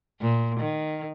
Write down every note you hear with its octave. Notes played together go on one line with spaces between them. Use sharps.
A#2
D#3